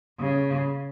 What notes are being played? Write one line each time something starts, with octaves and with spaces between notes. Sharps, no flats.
C#3